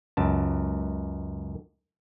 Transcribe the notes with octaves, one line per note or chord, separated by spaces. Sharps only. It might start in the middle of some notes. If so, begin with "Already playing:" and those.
C#2 F#2 A5